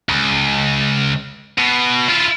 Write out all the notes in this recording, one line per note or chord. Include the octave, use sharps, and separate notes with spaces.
C#2
B2
E4 F4